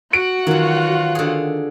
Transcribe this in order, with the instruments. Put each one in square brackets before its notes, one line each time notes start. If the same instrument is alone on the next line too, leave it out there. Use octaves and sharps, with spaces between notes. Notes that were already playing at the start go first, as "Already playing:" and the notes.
[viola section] F#4 F#5 [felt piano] D7
[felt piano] D#3 [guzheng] E3 F#3 [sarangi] F4
[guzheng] D3 G#4